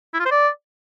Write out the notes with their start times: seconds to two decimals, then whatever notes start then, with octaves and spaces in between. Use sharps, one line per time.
0.14 E4
0.20 F4
0.25 C5
0.31 D5